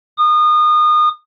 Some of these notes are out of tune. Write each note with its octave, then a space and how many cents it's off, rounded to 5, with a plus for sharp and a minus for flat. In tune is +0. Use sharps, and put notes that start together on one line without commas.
D#6 -30